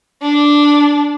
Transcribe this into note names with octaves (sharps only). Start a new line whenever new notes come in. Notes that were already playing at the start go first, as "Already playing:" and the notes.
D4